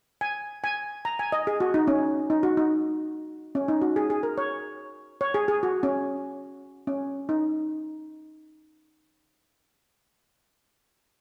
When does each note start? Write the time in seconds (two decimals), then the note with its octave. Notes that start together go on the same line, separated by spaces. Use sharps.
0.21 G#5
0.64 G#5
1.05 A#5
1.19 G#5
1.32 D#5
1.47 G#4
1.60 F#4
1.74 D#4
1.87 C#4
2.30 D#4
2.43 F#4
2.57 D#4
3.55 C#4
3.68 D#4
3.82 F#4
3.96 G#4
4.10 G#4
4.23 A#4
4.38 C#5
5.21 C#5
5.34 G#4
5.48 G#4
5.63 F#4
5.83 C#4
6.87 C#4
7.29 D#4